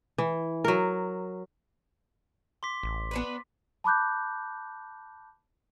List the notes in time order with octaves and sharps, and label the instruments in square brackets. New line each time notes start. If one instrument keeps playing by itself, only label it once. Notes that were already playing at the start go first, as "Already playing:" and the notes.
[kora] E3
F#3 A#4
[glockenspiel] C6 D6 B6
[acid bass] A1
[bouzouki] B3 D4 B4
[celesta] A5 B5 D6 F#6 G6